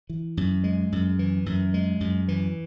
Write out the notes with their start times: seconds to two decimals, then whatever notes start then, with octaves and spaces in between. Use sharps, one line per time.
0.09 E3
0.37 F#2
0.64 G#3
0.92 F#2
1.19 E3
1.46 F#2
1.74 G#3
2.00 F#2
2.28 E3